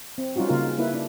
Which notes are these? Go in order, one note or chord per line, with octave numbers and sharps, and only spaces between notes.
C4
G3 C#4 D#4 F4 F#4
C#3 A#3 D#4 F4 A#4
D#4
A#3 D#4 E4 B4
D4